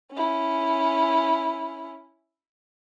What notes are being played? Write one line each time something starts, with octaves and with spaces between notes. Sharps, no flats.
C#4 E4